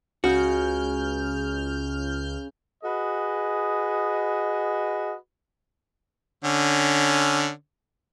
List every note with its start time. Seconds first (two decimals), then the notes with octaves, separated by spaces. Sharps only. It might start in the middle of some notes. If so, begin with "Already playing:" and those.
0.24 C#2 C#3 F#4 F6 G6
2.84 F#4 G#4 B4 D#5
6.44 D3 C#4